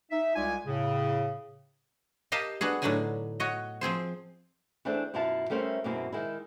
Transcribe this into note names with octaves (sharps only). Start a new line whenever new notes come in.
D#4 E5
C2 G#3 F4 D5 G#5
A2 C#3
G4 A#4 D#5 F5 A5
B3 D4 F#4 G#4
A2 D3 F#3 D4 D#4 G#5
F#4 C#5 D#5
F3 C4 G#4 C5
E3 A3 C4 D4 G#4 A4
F#2 B2 E4 F4 F5 A5
G3 A3 C#4 A#4 C5 E5
F#2 B2 G#3 A#3 C4 E4
D#3 G#3 E4